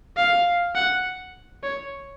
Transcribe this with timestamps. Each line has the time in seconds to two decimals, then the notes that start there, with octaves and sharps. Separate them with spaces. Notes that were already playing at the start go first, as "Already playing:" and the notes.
0.17 F5
0.75 F#5
1.63 C#5